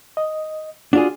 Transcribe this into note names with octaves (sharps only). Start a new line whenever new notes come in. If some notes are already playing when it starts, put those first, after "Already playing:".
D#5
D4 F4 F#4 G#4 D5